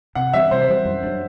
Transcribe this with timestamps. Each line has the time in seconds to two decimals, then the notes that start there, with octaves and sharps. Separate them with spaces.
0.15 C3 F#5
0.33 E3 G3 C4 E5
0.51 C3 C5
0.68 E3 G3 C4
0.85 F#2
1.03 F#3 A3 D4